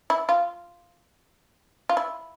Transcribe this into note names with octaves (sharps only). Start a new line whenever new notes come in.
E4
F4
F4
E4